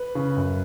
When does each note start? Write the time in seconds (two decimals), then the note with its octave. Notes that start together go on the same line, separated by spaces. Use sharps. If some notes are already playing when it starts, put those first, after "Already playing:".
Already playing: B4
0.15 C#3
0.36 F#2